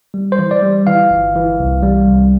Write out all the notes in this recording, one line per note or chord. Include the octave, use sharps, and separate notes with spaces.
G3
C5
E3
D5
G3
E3 F5
G1
E3
C2
G3
C2